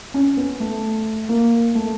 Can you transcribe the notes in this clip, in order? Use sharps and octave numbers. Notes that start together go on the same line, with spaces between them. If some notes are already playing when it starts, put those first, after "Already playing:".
C#4
B3
A3
A#3
A3